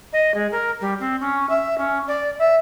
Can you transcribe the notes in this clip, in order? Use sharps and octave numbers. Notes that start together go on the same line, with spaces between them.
D#5
G#3
A#4
G3
C4
C#4
E5
C#4
D5
E5